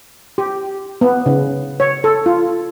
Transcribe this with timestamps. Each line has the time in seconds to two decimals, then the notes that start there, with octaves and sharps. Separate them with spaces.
0.38 G4
1.01 B3
1.26 C#3
1.80 C#5
2.04 A4
2.26 F4